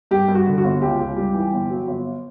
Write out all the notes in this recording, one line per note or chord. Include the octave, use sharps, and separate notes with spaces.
G2 G4
G2
F#4
D3
F#4
G1
C#2 G4
C#2
G3
E3
G1
F#3
G1